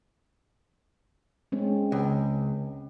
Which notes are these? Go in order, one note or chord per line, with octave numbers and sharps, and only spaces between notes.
G#3 C4 C#4
C#2